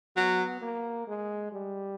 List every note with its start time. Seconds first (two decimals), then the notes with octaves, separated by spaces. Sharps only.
0.16 F#3 B3
0.61 A#3
1.07 G#3
1.52 G3